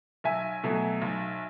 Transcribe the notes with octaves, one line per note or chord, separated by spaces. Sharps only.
B1 E5 G#5
B2 F#3 A3
B1